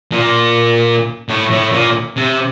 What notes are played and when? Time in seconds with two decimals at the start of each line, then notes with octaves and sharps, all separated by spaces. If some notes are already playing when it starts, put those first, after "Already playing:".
0.12 A#2
1.29 A2
1.51 A2
1.73 A#2
2.17 C3